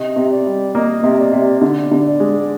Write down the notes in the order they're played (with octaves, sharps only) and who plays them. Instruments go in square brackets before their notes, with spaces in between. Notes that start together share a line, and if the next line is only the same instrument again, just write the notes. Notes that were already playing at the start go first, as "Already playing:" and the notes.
Already playing: [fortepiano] C3 [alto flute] D#5
[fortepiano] C3
[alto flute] D5
[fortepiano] G3
[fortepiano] A#3 [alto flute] D#5
[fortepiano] C3
[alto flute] D5
[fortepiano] C3
[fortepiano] D3 [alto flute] D5
[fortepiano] D3
[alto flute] D5
[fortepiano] G#3